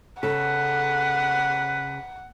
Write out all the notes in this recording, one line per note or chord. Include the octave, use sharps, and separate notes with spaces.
C#3 A4 B4 F#5